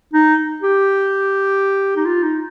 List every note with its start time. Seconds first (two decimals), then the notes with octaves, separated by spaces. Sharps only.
0.13 D#4
0.62 G4
1.96 D#4
2.06 F4
2.23 D#4